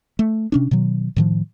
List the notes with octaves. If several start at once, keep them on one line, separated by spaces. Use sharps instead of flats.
A3
C3 C#4 D4
B2 D#3 F#3
A2 D#3 F3